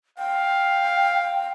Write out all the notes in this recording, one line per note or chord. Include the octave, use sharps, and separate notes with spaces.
F5 G5